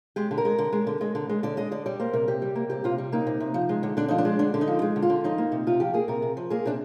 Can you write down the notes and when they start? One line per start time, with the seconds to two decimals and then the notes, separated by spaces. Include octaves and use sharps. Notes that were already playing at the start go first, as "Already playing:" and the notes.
0.16 G#3 G4
0.31 D3
0.38 A#4
0.45 G#3
0.59 D3
0.72 G#3
0.87 D3
1.01 G#3
1.15 D3
1.29 G#3
1.43 D3 D5
1.57 G#3 D#5
1.72 D3 D5
1.86 G3 D5
2.00 A#3 C5
2.13 C3 A#4
2.28 C3 G4
2.42 G3
2.56 A#3
2.70 C3 G4
2.84 C3 F4
2.98 G3
3.12 A#3 D#4
3.27 C3
3.40 C3
3.54 F3
3.69 G#3
3.83 D3
3.97 D3 D4
4.08 F3 D#4
4.18 D4
4.25 G#3
4.39 D3 D4
4.54 D3
4.61 D#4
4.68 F3
4.82 G#3
4.96 D3
5.02 F4
5.10 D3
5.24 F3 D#4
5.38 A#3
5.52 C3
5.67 C3 F4
5.80 F3 G4
5.94 A#3 G#4
6.08 C3 A#4
6.22 C3
6.37 F3
6.50 A#3 G#4
6.66 C3 D4